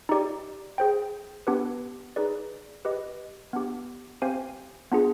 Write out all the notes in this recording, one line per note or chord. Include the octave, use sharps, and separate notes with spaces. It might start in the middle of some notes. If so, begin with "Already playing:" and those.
D#4 G4 D5
G#4 C5 G5
B3 D4 G4 B4
D#4 G#4 B4 D5
G4 B4 D#5
B3 D4 G4
C4 G4 C5 F5 G#5
B3 D4 F4 G#4